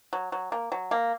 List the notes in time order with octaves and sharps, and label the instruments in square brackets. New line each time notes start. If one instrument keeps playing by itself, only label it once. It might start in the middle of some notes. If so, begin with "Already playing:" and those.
[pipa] F#3
F#3
A#3
F#3
A#3